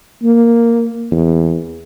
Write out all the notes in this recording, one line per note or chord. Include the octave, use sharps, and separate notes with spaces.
A#3
E2